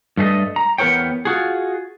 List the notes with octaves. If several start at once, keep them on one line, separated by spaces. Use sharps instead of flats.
G2 A3 G#4 D#5
A#5
E2 B3 A#4 C5 C#5 G5
F4 F#4 G#4